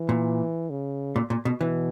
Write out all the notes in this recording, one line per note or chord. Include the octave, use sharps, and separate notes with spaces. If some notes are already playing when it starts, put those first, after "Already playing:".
Already playing: E3
A#2
C#3
A#2
A#2
B2
B2 E3